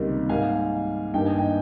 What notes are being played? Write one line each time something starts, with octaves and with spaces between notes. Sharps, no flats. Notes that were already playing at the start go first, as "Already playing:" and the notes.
Already playing: C#2 C3 D#3 G3 A#3
G#2 G3 A#3 F5 G#5
G2 D#3 A#3 G5
G#5
D#5 G5